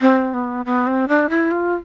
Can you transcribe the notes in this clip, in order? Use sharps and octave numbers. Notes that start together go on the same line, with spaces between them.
C4
B3
B3
C4
D4
E4
F4